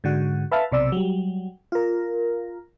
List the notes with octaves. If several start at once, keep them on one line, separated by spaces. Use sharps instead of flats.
G#2 D3 F#4
B4 E5 F5 A5
B1 C3 D5 E6
F#3 G3
F4 A#4